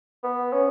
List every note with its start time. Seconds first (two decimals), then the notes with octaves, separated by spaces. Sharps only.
0.23 B3
0.53 C#4